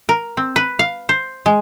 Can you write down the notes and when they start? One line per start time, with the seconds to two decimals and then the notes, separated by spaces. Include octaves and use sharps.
0.09 A#4
0.37 C4
0.56 B4
0.79 F5
1.09 C5
1.46 G#3